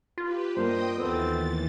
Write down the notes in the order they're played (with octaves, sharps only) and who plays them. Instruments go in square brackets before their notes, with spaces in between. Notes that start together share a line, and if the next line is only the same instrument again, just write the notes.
[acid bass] F4 [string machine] G4 B4
[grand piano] G2 A#3 [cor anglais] C5 [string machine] D#5 G5 D#6
[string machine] D#2 E3 A6 [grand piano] B3 A4 [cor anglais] C4